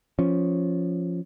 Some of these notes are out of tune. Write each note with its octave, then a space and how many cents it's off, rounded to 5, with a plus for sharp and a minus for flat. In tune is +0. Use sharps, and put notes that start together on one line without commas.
F3 +0 C#4 +0